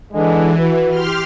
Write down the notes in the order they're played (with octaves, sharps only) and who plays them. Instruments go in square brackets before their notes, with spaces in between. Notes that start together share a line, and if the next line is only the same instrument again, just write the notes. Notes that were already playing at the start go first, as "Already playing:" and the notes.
[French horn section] D3 G#3 [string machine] E3
[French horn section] F#4 B4
[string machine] G4 C6 F6